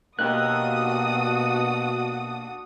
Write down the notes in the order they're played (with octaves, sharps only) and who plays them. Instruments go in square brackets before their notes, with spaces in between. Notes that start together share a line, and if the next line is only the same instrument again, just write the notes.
[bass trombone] B2 [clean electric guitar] A#3 D#4 G4 [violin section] D4 F#4 D#6 [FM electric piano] F#6